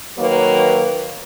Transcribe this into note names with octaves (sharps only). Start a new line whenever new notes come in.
D#3 F#3 A#3 B4 C#5